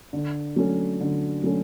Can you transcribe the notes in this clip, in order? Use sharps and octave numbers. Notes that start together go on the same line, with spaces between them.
D3
F#3 A3 C#4
D3
F#3 A3 C#4